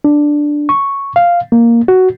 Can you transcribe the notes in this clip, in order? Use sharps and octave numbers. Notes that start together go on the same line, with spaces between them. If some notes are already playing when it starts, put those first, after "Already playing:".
D4
C#6
F5
A#3
F#4